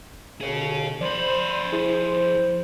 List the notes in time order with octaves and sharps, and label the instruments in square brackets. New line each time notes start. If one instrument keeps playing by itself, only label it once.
[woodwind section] D#2 B2 D3 [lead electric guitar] G#4 C#5
[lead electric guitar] F2 B5 [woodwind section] C5 [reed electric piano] D5
[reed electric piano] E4 G#4